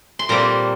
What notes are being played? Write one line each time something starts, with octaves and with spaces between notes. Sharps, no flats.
C6
A#2 G3 C4 A#5